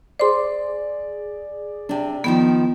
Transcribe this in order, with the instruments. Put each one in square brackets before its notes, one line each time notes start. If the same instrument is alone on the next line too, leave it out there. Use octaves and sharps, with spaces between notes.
[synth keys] G#4 D5 [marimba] C5 C6 D6
[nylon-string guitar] C3 D4
[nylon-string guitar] D3 D#3 F3 [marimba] B3